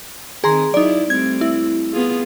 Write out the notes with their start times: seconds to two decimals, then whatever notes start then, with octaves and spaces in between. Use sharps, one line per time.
0.44 D#3 C4 G#4 A#5 C6
0.74 F#3 D#4 E4 D5
1.10 G3 A3 C4 G#6
1.41 E4
1.93 B3 F4 G#4